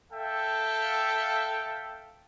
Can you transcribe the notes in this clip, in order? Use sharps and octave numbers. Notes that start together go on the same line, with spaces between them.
A4 E5 F5 G5